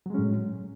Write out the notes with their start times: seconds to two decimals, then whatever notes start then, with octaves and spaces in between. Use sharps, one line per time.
0.06 F#3
0.10 G#3
0.14 C#4
0.19 A2